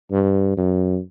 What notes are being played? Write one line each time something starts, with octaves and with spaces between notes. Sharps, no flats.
G2
F#2